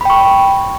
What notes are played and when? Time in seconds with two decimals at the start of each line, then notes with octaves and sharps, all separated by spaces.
0.01 B5
0.05 G5
0.10 C#6